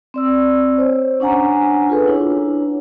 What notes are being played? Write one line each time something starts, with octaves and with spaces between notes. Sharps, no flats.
C4 D5 E6
C5 C#5
C#4 D4 F#5 G#5 A#5
F4 G#4 A4 B4
D4 E4 C#5